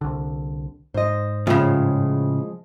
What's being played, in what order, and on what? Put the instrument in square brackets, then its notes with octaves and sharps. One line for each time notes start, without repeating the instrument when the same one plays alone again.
[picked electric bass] C2 D3
[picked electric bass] G#2 [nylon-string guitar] C5 D#5
[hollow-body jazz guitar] A2 C#3 [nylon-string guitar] F3 G#3 F4